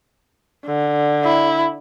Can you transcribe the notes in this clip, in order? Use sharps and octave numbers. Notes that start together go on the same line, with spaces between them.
D3
E4